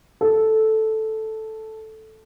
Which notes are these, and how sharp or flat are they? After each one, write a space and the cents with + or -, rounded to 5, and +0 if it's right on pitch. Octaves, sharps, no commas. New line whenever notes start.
A4 -5